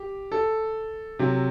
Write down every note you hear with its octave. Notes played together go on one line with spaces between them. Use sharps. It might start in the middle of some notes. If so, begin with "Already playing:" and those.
Already playing: G4
A4
C3 F#3